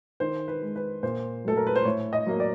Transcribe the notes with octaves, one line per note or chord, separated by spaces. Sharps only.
D#3 C5
B4
G#3
B4
A#2 C5
F#3 A3 A4
A#4
B4
C5
A2 C#5
D#5
F#3 A#3
D5